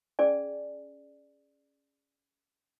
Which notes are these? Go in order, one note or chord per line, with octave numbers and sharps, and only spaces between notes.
C#4 G#4 D5 G#5